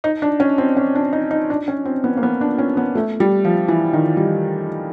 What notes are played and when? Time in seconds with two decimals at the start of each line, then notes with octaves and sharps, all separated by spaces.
0.04 D#4
0.22 D4
0.40 C#4
0.58 C4
0.77 C#4
0.95 D4
1.13 D#4
1.31 D#4
1.50 D4
1.68 C#4
1.85 C4
2.04 B3
2.17 A#3
2.23 B3
2.41 D4
2.58 C#4
2.77 B3
2.95 A3
3.20 G3
3.45 F3
3.68 E3
3.93 D#3
4.17 G3